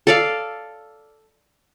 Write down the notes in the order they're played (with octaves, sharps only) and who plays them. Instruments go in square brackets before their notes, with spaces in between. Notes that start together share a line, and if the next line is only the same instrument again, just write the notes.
[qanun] A4 D5 F5